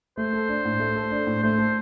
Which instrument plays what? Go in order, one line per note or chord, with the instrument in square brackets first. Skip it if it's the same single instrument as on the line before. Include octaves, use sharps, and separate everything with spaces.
[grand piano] A3 [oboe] C5
[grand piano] A4
D4
A2
A3
A4
D4
A2
[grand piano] A3 [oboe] C5
[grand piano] A4